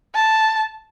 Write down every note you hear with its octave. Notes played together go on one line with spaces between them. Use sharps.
A5